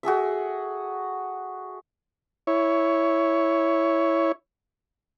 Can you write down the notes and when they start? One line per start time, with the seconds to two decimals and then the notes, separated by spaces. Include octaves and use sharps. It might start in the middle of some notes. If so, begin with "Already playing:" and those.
0.03 F#4 G#4 A4 E5
2.47 E4 C#5